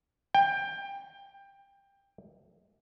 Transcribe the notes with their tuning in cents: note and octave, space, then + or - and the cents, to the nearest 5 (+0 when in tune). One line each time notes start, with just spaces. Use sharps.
G5 +20